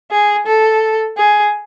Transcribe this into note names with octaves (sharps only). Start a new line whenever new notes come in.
G#4
A4
G#4